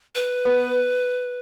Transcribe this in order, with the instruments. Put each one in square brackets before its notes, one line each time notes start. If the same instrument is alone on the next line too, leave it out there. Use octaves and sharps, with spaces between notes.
[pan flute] B4
[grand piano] B3